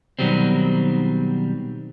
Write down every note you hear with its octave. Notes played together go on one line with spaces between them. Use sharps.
B2 D#3 F#3 G3 C4